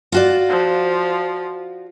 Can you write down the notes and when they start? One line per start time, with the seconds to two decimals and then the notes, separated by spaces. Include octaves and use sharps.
0.12 F4 F#4 D5
0.49 F3